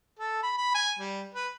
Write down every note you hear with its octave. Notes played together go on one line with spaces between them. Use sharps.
A4
B5
B5
G#5
G3
B4